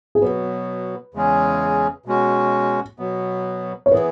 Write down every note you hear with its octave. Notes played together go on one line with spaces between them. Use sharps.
G#4
B2 F#3 B3 B4
E2 C#3 G#3 C#4 G#4
B2 G#3 C#4 F#4
B2 F#3 B3
C#5
E3 B3 E4 G#4 B4